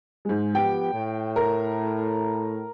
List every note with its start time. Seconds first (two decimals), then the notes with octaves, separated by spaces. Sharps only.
0.25 G#2 G#3
0.55 F3 B3 G4 G5
0.94 A2
1.36 A#4